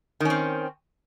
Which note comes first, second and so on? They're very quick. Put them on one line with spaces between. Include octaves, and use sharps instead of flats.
D#3 C#4 C4